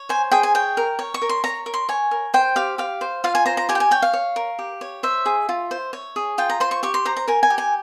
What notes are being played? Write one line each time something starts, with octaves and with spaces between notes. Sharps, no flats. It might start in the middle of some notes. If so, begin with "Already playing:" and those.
Already playing: C#5
C5 G#5
G#4 G5
G#5
C#5 G5
A#4
C#5
C#6
A#4
C6
C#5 A#5
A#4
C6
C#5 G#5
A#4
C5 G5
G4 F5
G4 F5
C5
F4 F5
G#5
C5 A#5
A#5
G4 G#5
G5
G#5
C#5 G5
F5
C#5
A#4
G4
C#5
C5 E5
G#4
F4
C5
C#5
G#4
F4 G5
A#5
C5 C6
C#6
G4 C#6
C6
C5 A#5
A#5
A#4 G#5
G#5
G4
G#5